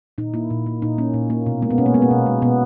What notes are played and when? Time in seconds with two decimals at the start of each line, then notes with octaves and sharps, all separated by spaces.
0.18 A#2 D#4
0.34 A#3 E4
0.50 A#2
0.66 A#3
0.82 A#2 D#4
0.98 A#3 C#4
1.14 A#2
1.30 A#3
1.46 B2
1.62 G#3 A#3
1.70 B3
1.78 B2 C#4
1.86 A#3
1.94 G#3 B3
2.02 A#3
2.10 B2
2.26 G#3
2.42 B2 B3